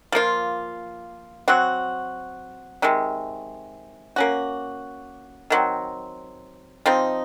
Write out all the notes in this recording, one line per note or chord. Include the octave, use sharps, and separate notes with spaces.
F3 A#3 F4
F#3 C4 F#4
C3 D#3 G#3
A#3 C#4 F#4
D#3 F#3 C4
F3 C4 D#4